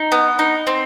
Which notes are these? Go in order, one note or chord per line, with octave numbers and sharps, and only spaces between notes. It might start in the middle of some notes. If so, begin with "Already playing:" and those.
Already playing: D#4
B3
D#4
C4